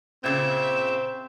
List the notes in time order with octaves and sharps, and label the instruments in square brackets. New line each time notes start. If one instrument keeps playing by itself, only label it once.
[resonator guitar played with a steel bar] A#2 C#3 [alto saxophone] C4 [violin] E5